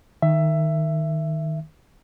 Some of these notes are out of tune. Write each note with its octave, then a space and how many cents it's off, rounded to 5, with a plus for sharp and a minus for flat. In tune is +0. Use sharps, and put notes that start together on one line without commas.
D#3 +0 E5 +15